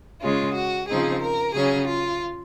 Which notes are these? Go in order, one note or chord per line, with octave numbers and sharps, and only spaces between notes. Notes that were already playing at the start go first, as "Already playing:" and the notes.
C#3 G#3 C#4 F4
F#4
C#3 F3 C4 D#4 G#4
A#4
C#3 F#3 C#4 G#4
F4